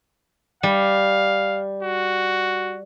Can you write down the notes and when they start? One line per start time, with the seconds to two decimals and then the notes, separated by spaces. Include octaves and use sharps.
0.63 G3 F5
1.83 F#4